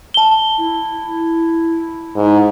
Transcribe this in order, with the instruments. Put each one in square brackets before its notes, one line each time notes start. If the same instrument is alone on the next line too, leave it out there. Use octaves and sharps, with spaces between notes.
[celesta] A5 G7
[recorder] E4
[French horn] G#2